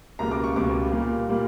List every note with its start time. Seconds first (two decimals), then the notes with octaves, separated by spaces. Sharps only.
0.19 C#2 B2 G3 A#3 A#5
0.31 D6
0.44 C#6
0.56 C#2 B2 G3 A#3 D6
0.92 A#2 G3 A#3
1.29 A#2 G3 A#3